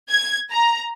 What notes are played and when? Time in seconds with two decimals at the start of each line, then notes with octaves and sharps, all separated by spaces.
0.10 G#6
0.52 A#5